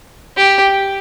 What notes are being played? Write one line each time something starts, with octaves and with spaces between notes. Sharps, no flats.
G4